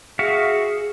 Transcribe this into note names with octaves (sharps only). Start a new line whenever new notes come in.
F#4 G#4 E5 F5